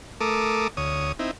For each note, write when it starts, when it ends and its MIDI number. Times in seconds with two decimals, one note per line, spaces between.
0.21 0.68 57
0.21 0.68 69
0.21 0.68 70
0.21 0.68 86
0.21 0.68 87
0.77 1.12 38
0.77 1.12 73
0.77 1.12 87
1.19 1.31 60
1.19 1.31 63
1.19 1.31 64